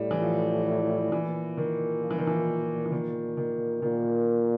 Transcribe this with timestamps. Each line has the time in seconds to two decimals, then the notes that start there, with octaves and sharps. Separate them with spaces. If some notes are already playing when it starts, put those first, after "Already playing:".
Already playing: A2 G3
0.11 E3
0.22 F3
1.12 A#2 E3
1.58 D#3
2.02 F3
2.11 E3
2.19 D#3
2.27 E3
2.86 E3
2.92 D#3
3.37 D#3
3.82 A#2 D#3